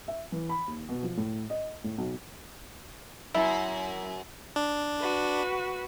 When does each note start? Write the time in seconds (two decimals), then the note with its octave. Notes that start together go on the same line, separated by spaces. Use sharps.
0.08 E5
0.32 E3
0.49 B5
0.67 D#2
0.89 B2
1.03 F3
1.17 A2
1.50 D#5
1.84 A2
1.98 B1
3.34 F#2 E4
4.56 D4
5.01 F#4 B4